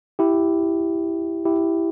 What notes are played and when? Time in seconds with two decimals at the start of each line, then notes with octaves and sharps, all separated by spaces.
0.19 E4 G4
1.45 E4 G4